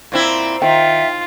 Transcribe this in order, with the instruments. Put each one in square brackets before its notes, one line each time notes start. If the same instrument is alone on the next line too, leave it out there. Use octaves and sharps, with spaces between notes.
[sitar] A#2 C4 E4
[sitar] D#3 [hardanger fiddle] F4 [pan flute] E5 [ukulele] G5